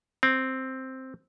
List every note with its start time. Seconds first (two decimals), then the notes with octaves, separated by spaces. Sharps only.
0.23 C4